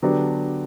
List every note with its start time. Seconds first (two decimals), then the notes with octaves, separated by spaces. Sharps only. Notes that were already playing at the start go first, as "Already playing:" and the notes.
0.02 D3 F#3 B3 D4 G4